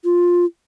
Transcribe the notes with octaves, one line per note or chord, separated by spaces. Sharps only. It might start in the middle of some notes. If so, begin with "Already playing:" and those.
F4